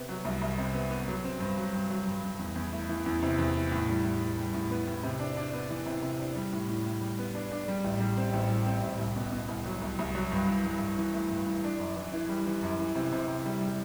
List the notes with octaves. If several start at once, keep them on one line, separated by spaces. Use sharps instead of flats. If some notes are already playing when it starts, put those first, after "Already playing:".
Already playing: C3 B3
F#3
C2
C2
C3
B3
B3
F#3
C4
G2
F#3
G2
F#3
G2
G2
E2
E2
A3
E3
E2
C3
E2
E3
A2
G3
A2
A2
G3
A2
B3
A2
C3
D4
D4
B3
E3
C3
C3
D4
G3
A2
A2
A2
G3
B3
D4
D4
G3
A1
G3
C4
A1
G3
C4
A1
C2
B2
B2
C2
F#3
C2
C2
F#3
G2
E3
G2
G2
E3
A3
G2
E3
D4
F#2
E3
E3
G3
E3
F#2
E3
C3
C3
C3
G3
G3